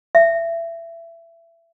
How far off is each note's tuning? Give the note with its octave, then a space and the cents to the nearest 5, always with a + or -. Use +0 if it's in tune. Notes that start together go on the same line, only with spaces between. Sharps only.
E5 +25